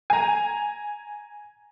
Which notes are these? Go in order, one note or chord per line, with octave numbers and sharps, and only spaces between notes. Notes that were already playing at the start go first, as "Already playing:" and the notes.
G#5 A#5